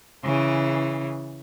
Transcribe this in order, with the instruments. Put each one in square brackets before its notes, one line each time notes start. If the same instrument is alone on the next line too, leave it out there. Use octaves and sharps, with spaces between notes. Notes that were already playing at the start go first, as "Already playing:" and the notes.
[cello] C#3 E3